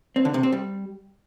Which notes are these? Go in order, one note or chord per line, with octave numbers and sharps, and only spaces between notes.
C4
D3
C3
C4
G3